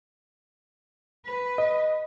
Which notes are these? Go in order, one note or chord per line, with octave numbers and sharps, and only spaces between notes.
B4
D#5